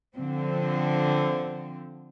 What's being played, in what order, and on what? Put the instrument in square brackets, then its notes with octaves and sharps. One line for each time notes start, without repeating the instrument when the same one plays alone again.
[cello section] D3 F3 C4